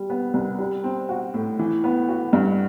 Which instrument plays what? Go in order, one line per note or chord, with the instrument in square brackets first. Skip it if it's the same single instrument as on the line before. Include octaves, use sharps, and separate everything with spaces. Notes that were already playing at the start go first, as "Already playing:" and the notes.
Already playing: [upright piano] G3
B3
C2
G3
C4
F#4
A2
E3
B3
F#4
G2